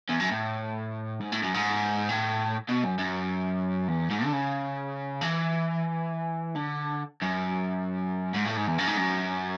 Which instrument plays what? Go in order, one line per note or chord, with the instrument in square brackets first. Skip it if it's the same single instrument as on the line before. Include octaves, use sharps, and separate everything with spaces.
[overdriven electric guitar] E2
F#2
A2
G#2
A2
F#2
G#2
A2
B2
F#2
F#2
E2
G#2
D3
C#3
E3
D3
F#2
G#2
A2
G#2
E2
F#2
G#2
F#2